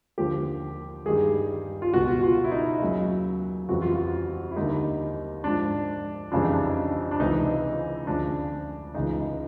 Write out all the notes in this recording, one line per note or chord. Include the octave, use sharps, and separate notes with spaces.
D#2 D3 F3 G4
G2 D#3 G3 G#4
F4
C#2 B2 G3 F#4
F4
E4
D#4
D#2 C#3 F#3
F2 C#3 E3 G3 F#4
F4
F#4
E4
D#2 D3 G3 D#4
G#2 F3 D4
F2 C#3 E3 G3 D4
D#4
D4
D4
C#2 C3 E3 D#4
D2 C#3 F3 D4
C#2 C#3 E3 D#4